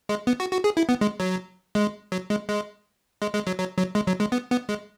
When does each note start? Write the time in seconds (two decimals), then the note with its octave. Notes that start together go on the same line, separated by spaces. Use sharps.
0.09 G#3
0.27 B3
0.40 F#4
0.52 F#4
0.64 G#4
0.77 E4
0.89 B3
1.01 G#3
1.20 F#3
1.75 G#3
2.12 F#3
2.30 G#3
2.49 G#3
3.22 G#3
3.35 G#3
3.47 F#3
3.59 F#3
3.78 F#3
3.95 G#3
4.07 F#3
4.20 G#3
4.32 B3
4.51 B3
4.69 G#3